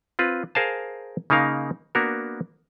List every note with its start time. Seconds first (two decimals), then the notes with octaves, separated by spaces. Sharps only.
0.19 C4 F4 B4
0.55 G#4 A#4 C5 F5 G#5 A5
1.30 C#3 A#3 D#4 A#4 F5
1.95 A#3 B3 D4 F#4 A#4